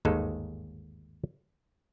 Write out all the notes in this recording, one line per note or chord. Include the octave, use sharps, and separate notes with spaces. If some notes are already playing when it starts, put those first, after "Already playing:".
G1 D#2 G#2 D#3 G#3 A4